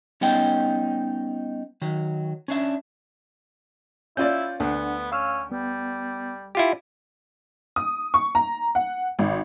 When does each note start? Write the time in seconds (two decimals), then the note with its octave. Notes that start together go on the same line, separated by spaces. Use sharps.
0.21 G3 B3 C#4 D#4 G5
1.82 D#3 F#3
2.48 C#4 D4 E5
4.17 C#4 E4 F4 D5 G6
4.60 D2 B3 D4 F#5
5.12 C#4 F5 E6 F6
5.52 G3 B3
6.55 E4 F4 G4
7.76 D#6
8.14 C#6
8.35 A#5
8.75 F#5
9.19 G#1